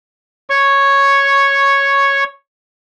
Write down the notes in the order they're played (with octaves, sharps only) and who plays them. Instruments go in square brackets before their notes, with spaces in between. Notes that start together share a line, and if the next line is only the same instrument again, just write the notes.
[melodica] C#5 C#6